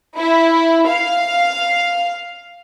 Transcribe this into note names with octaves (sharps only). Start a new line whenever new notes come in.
E4
F5